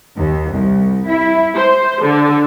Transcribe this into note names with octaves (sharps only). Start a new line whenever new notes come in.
D#2
C2
E4
C5
D3